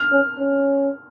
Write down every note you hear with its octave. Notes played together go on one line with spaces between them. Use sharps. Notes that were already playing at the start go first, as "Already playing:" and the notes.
Already playing: F6
C#4
C#4